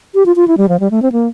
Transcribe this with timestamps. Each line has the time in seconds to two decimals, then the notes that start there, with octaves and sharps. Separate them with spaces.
0.14 G4
0.26 F4
0.36 F4
0.48 E4
0.57 G3
0.69 F3
0.80 G3
0.91 A3
1.02 C4
1.12 A#3